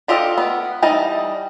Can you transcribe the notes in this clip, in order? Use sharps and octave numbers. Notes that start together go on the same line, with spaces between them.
D4 F4 G4 A4 D#5
B3
E3 G3 D#4 D#5 A5